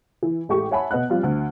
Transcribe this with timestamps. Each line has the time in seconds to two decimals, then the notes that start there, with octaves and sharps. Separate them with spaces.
0.23 E3
0.49 A1 G#3 A3 G4 C#6
0.71 C#5 E5 F#5 G#5 A5 B5
0.91 B2 B3 D#5 F#5 F#6
1.09 F3 G3 C4 F4
1.23 D2